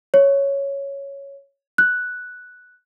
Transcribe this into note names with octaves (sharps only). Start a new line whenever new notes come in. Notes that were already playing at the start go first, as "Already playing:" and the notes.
C#5
F#6